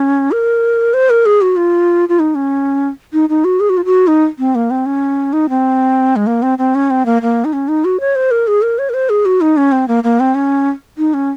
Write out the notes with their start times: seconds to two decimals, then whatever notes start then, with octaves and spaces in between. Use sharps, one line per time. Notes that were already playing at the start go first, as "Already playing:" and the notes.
Already playing: C#4
0.32 A#4
0.94 C5
1.10 A#4
1.26 G#4
1.41 F#4
1.56 F4
2.09 F4
2.19 D#4
2.35 C#4
3.13 D#4
3.29 D#4
3.45 F#4
3.60 G#4
3.70 F#4
3.77 F4
3.85 F#4
4.07 D#4
4.39 C4
4.55 A#3
4.71 C4
4.86 C#4
5.33 D#4
5.49 C4
6.16 G#3
6.27 A#3
6.42 C4
6.58 C4
6.75 C#4
6.90 C4
7.06 A#3
7.22 A#3
7.45 D#4
7.53 C#4
7.68 D#4
7.85 F#4
8.00 C#5
8.16 C5
8.31 A#4
8.47 G#4
8.62 A#4
8.79 C#5
8.89 A#4
8.94 C5
9.10 G#4
9.25 F#4
9.41 D#4
9.57 C#4
9.72 C4
9.88 A#3
10.04 A#3
10.20 C4
10.35 C#4
10.98 D#4
11.14 C#4